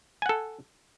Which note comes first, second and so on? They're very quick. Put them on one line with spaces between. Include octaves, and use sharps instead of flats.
G#5 F#5 A4